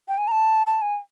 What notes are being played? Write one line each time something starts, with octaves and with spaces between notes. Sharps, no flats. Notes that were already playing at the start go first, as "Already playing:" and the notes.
G5
G#5
A#5
A5
A5
G#5